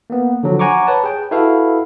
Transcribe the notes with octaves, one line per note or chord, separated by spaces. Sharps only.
A#3 B3
D3 F3 F#3
F#5 G#5 A#5 C#6 D6
B4 C#5 A5
G#4 G5
E4 F#4 A4 B4 F5